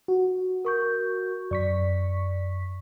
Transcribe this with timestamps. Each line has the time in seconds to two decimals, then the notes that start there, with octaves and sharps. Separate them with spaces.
0.08 F#4
0.65 A#4 C#6 G6
1.51 F#2 D5 C#6 B6